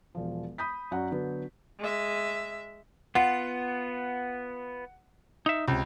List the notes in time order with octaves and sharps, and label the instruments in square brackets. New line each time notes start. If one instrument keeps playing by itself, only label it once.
[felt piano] E1 F3
B5 D#6 G6 B6
F#2 F#4 D5 F#5 A#5
D3 F#3 B3
[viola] G#3 E5
[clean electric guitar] B3 F4 [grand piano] F#5
[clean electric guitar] D#4 E5
[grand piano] C#2 [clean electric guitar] C3